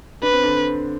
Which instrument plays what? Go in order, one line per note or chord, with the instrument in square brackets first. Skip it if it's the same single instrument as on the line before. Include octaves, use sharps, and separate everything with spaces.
[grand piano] D4 [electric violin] B4
[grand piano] C4
D3 D4